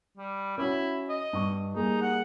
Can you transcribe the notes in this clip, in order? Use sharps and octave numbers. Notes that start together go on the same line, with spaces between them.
G3
C#4 E4 F#4
D#5
G2 C#6
G3 A#3 D#4 G#4
F#5